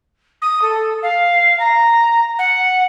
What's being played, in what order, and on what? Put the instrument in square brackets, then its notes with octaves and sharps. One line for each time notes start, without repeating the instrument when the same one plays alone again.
[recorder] D#6
A4
F5
A#5
F#5